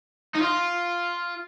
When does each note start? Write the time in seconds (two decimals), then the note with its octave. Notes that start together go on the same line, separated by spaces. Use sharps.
0.35 D#4
0.41 F4